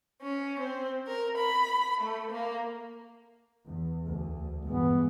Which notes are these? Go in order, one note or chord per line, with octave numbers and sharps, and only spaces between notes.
C#4
C4
A#4
B5
A3
A#3
E2
D2
G2 E3 G#3 B3